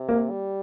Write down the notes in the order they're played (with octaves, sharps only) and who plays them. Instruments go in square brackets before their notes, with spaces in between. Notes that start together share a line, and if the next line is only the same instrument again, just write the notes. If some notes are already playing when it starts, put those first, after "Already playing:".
Already playing: [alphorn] C3
[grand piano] A#3
[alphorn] G3